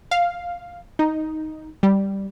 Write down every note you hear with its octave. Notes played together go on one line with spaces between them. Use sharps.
F5
D#4
G3